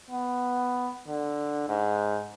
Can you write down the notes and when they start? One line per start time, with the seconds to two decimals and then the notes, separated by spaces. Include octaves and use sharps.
0.10 B3
1.08 D3
1.69 G#2